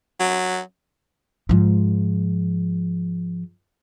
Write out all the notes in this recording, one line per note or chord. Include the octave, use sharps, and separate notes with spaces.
F#3
G#2 F3